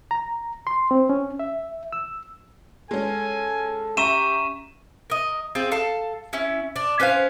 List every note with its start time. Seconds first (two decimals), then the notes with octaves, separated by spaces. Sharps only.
0.11 A#5
0.67 C6
0.91 C4
1.09 C#4
1.39 E5
1.93 E6
2.91 G#3 C#4 A4 G#5
3.97 C#4 G4 E5 A#5 C#6 D#7 E7
5.10 A#4 D#5
5.55 C4 F4 G#4
5.71 A4 F5 A5
6.33 C#4 E4
6.76 D4 D5
7.00 C#4 B4 C5 F5